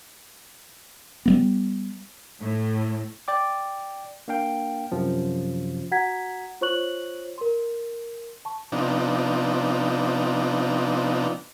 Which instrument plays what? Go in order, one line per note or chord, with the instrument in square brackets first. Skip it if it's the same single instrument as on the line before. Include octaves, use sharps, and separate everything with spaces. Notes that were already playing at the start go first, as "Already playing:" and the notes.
[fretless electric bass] G3 A3 B3
[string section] A2
[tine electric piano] D5 G5 D6
A#3 D4 F5 G5
F#2 C3 F3
[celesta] F#4 F#5 A#5 G#6 B6
F4 C5 C#5 C#6 F#6 F#7
A#4 C6
A5 C#6
[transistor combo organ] C3 F3 B3 D4 D#4